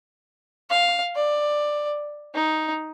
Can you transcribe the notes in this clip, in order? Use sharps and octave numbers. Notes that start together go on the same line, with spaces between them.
F5
D5
D#4